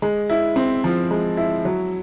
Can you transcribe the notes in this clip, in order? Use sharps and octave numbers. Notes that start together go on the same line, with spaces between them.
G#3
E4
C4
F3
G#3
E4
F#3